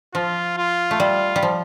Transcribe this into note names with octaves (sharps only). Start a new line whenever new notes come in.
F3 F4
F4
A3
G3 F4
G3
F3